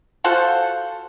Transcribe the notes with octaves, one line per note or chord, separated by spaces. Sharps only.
F4 F#4 A4 C5